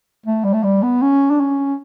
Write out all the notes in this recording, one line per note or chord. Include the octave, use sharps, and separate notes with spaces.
A3
G3
A3
G3
B3
C#4
D4
C#4